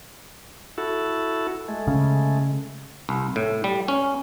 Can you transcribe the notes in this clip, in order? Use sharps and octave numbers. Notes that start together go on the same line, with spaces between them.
E4 F#4 A4
G#3 A3
C#3
C2
A2
G3
C#4